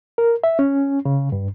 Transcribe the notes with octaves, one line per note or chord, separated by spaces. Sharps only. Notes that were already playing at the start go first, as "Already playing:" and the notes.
A#4
E5
C#4
C#3
G2